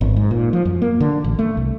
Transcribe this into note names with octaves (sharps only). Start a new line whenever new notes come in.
G#1
G#2
A#2
F3
F#2
A#3
D3
A1
A3
C2